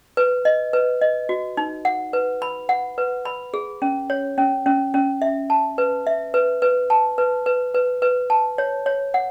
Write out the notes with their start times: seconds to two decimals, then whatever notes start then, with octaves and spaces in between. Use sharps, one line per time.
0.17 B4
0.45 D#5
0.73 B4
1.02 D#5
1.29 F#4
1.57 D#4
1.85 F#5
2.13 B4
2.42 B5
2.69 F#5
2.98 B4
3.25 B5
3.54 G#4
3.82 C#4
4.10 C#5
4.38 C#4
4.66 C#4
4.94 C#4
5.22 E5
5.50 A5
5.78 B4
6.07 E5
6.34 B4
6.62 B4
6.90 A5
7.18 B4
7.46 B4
7.74 B4
8.02 B4
8.30 A5
8.58 C#5
8.86 C#5
9.14 F#5